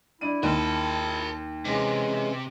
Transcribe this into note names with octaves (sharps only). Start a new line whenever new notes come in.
D4 E4 D#7
D#2 A#4 A5
C3 E3 G#3 C#4